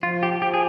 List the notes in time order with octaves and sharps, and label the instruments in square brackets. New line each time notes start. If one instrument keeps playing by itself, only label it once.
[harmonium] F3 [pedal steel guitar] F4
[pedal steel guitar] G4
[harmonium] F3 [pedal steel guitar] G4
[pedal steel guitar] G#4